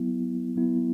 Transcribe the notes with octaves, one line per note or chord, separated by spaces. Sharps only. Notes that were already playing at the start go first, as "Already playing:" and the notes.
Already playing: F#3 B3 E4
F#3 B3 E4